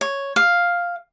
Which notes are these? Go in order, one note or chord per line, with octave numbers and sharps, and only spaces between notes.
C#5
F5